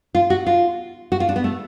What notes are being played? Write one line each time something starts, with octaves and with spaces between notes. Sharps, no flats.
F4
F#4
F4
F#4
F4
D4
B3
A3